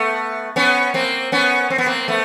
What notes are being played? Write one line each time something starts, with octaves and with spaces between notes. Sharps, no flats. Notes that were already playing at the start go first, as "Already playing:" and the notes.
Already playing: A3 B3
B3 C#4
A#3 C4
B3 C#4
C4
B3
A#3 C4
A3 B3